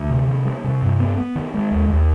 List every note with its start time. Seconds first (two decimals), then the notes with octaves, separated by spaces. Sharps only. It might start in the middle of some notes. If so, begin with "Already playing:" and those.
Already playing: D2
0.10 C3
0.28 D#3
0.45 G3
0.64 C3
0.82 G2
1.00 B3
1.17 B3
1.35 D#3
1.54 G#3
1.71 D#2
1.89 D#2